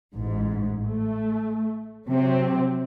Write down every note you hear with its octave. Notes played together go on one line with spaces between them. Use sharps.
A1 G#2
A3
C3 F#3 C4